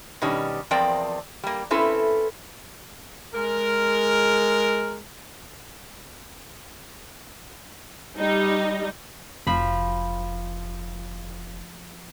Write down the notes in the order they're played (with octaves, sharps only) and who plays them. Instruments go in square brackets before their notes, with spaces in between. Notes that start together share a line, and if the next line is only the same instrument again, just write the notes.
[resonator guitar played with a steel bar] B2 D#3 G3 C#4
E2 F3 C4 A#4 D5 G5
G3 A#3
C4 C#4 E4 A4 B4
[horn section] G#3 A#4
[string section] G3 D#4
[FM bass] F1 [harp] F3 B5